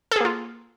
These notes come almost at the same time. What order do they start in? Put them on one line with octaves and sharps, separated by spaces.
A4 G#4 A#3 F4